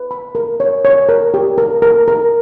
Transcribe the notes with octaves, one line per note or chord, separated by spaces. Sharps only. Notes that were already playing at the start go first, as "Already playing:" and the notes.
Already playing: B4
B5
A#4
C#5
C#5
A#4
G4
A#4
A#4
A#4